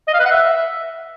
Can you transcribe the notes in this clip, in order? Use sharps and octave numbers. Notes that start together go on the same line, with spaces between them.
D#5
F5
B4
F#5
E5